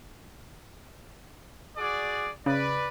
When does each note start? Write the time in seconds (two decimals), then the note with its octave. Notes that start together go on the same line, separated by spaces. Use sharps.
1.77 F#4 G#4 D5
2.46 C#3 B4 D5